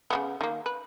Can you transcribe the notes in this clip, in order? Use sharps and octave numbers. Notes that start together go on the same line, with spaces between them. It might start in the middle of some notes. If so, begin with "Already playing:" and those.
C#3 A#3 B3
D#3 A#3
B4